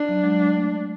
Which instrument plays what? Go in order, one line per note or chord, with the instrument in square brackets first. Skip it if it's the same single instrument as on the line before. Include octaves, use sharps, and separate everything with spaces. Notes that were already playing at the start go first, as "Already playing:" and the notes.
Already playing: [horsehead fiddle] D4
[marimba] F#3
G#3
F#3
G#3
A3